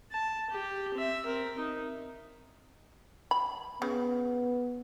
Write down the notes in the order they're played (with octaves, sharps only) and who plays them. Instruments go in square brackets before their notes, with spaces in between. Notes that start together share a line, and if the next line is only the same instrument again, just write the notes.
[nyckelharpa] A5
G4
C4 E5
C4 A#4
D#4
[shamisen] B5
[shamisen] C#3 [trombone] B3